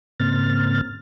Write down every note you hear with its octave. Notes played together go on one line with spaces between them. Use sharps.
G#2 C#3 A#3 C4 F6 A6